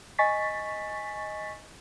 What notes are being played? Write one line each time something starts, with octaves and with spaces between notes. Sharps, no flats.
D#5 G#5 C#6 A6 B6